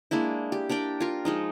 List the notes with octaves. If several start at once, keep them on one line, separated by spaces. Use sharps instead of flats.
G#3 A#3 D4 E4
G4
D4 A#4 D5 G5
F4 A#4
F3 G#3 D#4